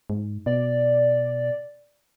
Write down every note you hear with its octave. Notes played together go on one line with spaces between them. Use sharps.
G#2
B2 D5